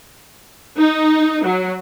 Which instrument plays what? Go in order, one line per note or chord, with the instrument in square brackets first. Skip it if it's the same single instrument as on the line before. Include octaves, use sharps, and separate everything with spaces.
[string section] D#4
F#3